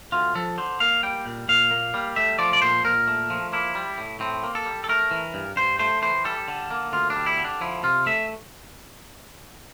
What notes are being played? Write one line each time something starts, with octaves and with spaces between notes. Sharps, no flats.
D2 F4
F3 A4
D3 C5
A#3 F5
G3 G5
A#2
A#2 F5
A#3
G3
A3 E5
F3 D5
D5
A#2 C5
A#2 A#4
A3
F3
A#3 E4
G3
A2
A2 C4
A#3
A4
G3
A4
A3 A#4
E3
G2
G2 C5
A3 C5
E3 C5
G3 A4
D3
A#3
D2 F4
D4
G3
E4
D3
D4
F3 E4
C3 F4
A3 E5